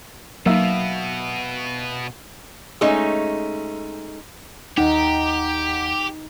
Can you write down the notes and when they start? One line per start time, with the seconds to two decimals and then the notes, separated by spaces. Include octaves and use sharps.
0.46 B2 F#3 A#3 B3 D#4 E5 F5 E6
2.81 G#3 A3 C#4 D#4
4.78 D#2 D#4 G4 F#5 G5